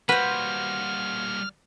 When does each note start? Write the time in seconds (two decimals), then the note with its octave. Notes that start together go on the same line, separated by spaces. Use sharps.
0.09 G3 A#3 F#4 B4 C5 F6